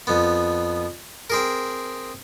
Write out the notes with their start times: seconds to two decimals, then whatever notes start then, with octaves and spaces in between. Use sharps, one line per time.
0.07 F2 B3
1.30 C4 G#4 A#4